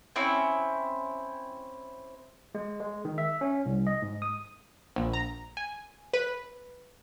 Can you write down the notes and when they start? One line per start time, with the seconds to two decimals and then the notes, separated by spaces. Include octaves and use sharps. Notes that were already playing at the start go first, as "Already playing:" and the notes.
0.16 C4 C#4 E4
2.55 G#3
2.80 G#3
3.05 D#3
3.18 E5
3.41 C#4
3.66 C2
3.87 D#5
4.02 G#2
4.22 D#6
4.96 A#1
5.13 A#5
5.57 G#5
6.13 B4